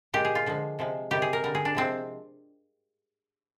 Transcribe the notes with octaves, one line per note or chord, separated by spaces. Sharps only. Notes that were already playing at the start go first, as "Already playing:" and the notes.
A#2 G#3 G4
G#4
F4
D3 F3 G#3
C3 F3 G#3
C3 D#3 G3 G4
G#4
A#4
D3 G3 A#4
G#4
D4
C3 F3 G#3 C4